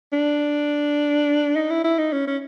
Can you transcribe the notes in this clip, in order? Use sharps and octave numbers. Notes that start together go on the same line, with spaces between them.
D4
D#4
E4
E4
D#4
C#4
C#4